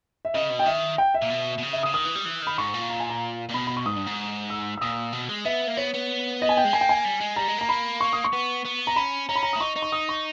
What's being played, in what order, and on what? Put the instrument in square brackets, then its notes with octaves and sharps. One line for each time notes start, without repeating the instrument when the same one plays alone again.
[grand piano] E5
[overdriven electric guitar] C#3 [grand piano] D#5
[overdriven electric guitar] B2
[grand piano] G5
[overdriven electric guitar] D#3 [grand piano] E5
[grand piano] G5
E5
[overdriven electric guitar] A#2
B2
B2
C#3
[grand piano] E5
D#6
[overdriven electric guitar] C#3
[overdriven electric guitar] D#3 [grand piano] D#6
[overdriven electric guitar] E3
G3
E3
[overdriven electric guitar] D#3 [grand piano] B5
[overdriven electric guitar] G#2 [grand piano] C#6
[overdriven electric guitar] A#2
[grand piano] A#5
G#5
A#5
[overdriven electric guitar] A#2
[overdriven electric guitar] B2 [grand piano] B5
[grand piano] B5
C#6
[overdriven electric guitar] G#2 [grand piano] D#6
[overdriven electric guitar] G2
G#2
[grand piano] E6
E6
[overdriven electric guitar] A#2 [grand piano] D#6
[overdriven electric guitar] B2
G#3
[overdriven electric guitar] B3 [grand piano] E5
[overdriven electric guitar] A#3
[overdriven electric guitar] B3 [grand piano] C#5
[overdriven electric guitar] B3
[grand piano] D#5
G#5
G5
[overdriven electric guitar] G#3
[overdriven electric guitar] A#3 [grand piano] G#5
[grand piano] G5
G#5
[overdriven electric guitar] G3
G#3
[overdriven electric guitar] G3 [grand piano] A#5
[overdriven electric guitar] G#3
[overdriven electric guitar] A#3 [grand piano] A#5
[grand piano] B5
C#6
D#6
C#6
[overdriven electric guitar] B3
B3
[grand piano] A#5
[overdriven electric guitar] C#4 [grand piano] B5
[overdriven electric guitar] C#4 [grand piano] A#5
[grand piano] B5
A#5
D#6
[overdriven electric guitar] E4
[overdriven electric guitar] D#4 [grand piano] C#6
[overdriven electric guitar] D#4
[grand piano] C#6
D#6
C#6